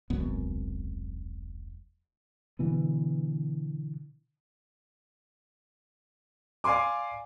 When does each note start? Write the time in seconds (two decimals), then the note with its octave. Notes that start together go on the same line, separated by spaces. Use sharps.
0.10 E1 C2 F#2 B3
2.59 B2 D3 E3 B3
6.64 D5 F5 G#5 C6 D6